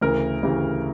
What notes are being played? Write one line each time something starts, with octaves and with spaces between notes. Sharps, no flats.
D2 C#3 E3 A#4
D2 C#3 E3 G4